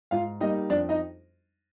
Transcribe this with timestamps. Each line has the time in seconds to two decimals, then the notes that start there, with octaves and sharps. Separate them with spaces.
0.11 G#2 F4 F5
0.40 G3 A#3 D#4 D#5
0.70 F2 D4 D5
0.89 D#4 D#5